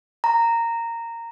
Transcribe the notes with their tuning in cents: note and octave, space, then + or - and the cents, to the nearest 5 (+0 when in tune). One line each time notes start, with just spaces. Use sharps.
A#5 -10